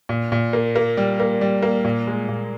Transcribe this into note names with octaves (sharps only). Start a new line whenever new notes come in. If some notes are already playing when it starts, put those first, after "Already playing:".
A#2
A#2
A#3
A#3
G3
A#3
G3
A#3
A#2
G#3
A#2